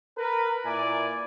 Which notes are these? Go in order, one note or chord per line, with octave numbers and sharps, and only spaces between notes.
A#4 B4
A#2 E4 D5 G#5